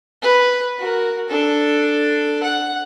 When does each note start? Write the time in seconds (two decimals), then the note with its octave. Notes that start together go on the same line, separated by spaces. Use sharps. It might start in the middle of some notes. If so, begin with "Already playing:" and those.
0.22 B4
0.79 F#4 A#4
1.28 D4 A4
2.43 F#5